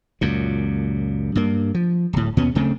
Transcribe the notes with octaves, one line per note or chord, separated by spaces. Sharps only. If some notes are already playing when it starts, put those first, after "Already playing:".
C#2 F#2 A#2
G2 A#3
F3
D1 A2
D#2 B2 B3 C#4
D1 C#3 A3 C4